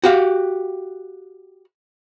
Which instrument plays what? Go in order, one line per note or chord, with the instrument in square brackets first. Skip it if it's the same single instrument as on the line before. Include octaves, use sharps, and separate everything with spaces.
[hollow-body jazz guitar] F#4 G4 F5